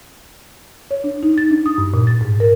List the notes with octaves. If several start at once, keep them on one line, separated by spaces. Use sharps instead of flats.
C#5
D4
D#4
A6
D4
D#6
G2
A#2
A6
G#2
A#4